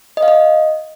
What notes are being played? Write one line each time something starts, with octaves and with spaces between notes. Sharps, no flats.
D#5
F5
D#5